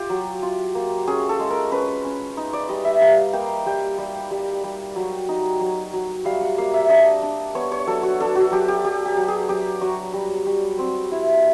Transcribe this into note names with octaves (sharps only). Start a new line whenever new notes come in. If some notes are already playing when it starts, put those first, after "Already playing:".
Already playing: F4 G4
F#3
F4
A#3
C#4 G#4
A4
G#3
A#4
C#4 B4
C#4
D#4
D5
G3 D#5
E5
G3 F5
A#3 G5
G3 G5
G3
G3
G3
F#3
D#4
F#3
F#3
G3 F5
F#5
A#3 F5
E5
D4 D#5
D4
B3 C#5
C#5
F#3 A4
F#4
D4 A4
F#4
F#3 G4
G4
F#3 G4
G4
F#3
G#4
F#3 G4
F#3 F#4
G3
G3
C4
E4